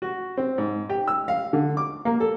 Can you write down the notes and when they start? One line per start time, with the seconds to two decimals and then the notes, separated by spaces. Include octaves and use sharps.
0.02 F#4
0.37 C4
0.58 G#2
0.89 G4
1.08 E6
1.28 F5
1.53 D3
1.77 D6
2.05 A#3
2.20 A4